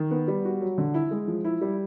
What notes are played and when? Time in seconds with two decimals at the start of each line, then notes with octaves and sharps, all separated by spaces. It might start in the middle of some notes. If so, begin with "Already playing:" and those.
Already playing: D#3
0.11 B3
0.28 G3
0.45 F#4
0.61 F#3
0.78 D3
0.94 E4
1.11 G#3
1.28 F3
1.44 E4
1.61 G3